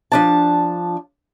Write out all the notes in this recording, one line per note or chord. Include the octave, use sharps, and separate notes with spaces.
F3 D4 A5